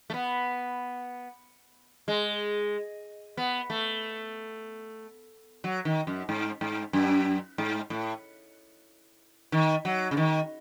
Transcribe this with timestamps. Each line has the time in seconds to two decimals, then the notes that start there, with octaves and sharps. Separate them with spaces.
0.10 A3
0.14 B3
2.08 G#3
3.37 B3
3.70 A3
5.64 F#3
5.85 D#3
6.07 F#2
6.29 G#2
6.61 G#2
6.93 F#2
7.58 G#2
7.90 A2
9.52 D#3
9.85 F#3
10.11 C#3
10.17 D#3